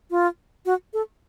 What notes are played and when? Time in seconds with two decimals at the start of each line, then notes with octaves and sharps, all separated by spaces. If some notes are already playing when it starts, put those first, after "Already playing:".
0.11 F4
0.66 F#4
0.93 A4